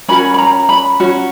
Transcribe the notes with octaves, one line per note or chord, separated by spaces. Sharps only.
C#4 F#4 A#4 B5
B5
A#5
B5
C#4 F#4